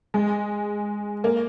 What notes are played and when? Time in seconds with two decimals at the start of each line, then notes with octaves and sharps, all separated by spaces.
0.14 G#3
1.24 A#3